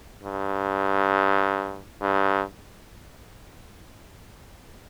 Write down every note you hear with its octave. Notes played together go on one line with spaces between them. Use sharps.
G2
G2